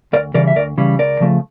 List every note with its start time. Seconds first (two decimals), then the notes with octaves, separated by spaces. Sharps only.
0.13 D2 A#4 D5
0.34 C#3 E3 G3 A#4 D5
0.47 E5
0.56 D2 A#4 D5
0.78 C#3 E3 G3
0.99 C#2 A#4 D5
1.20 C#3 F3 A3